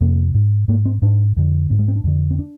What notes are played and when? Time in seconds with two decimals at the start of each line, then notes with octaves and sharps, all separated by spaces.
0.01 F2 C3 A#3
0.34 G#2
0.68 G#2 A#3
0.85 C4
1.02 G#2 D4
1.37 F2 D3
1.70 G#2 C4
1.79 G#3
1.88 C4
1.96 D4
2.04 F2 D3
2.31 C4
2.39 D4